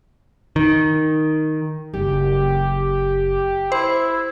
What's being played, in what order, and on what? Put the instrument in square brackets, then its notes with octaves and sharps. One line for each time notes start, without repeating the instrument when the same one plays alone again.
[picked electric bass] D#3
[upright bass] F#1 [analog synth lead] G4
[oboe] E4 [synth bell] C5